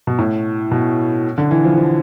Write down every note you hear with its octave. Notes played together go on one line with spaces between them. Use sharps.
B2
A2
B2
D3
E3
F3
F3